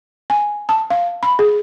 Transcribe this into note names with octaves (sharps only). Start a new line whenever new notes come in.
G#5
A5
F5
B5
G#4